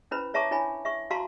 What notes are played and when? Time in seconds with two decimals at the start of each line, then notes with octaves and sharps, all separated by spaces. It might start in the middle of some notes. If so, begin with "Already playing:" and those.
0.11 C#4 E4 B4 C5 B5
0.34 C#5 E5 A5 A#5 C#6 D6
0.51 D4 E4 C#5 G#5 B5
0.85 E5 C#6
1.10 F#4 F5 A5 A#5 C6 C#6